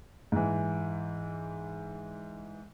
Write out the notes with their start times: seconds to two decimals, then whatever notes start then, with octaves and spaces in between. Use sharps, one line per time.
0.32 G#2 E3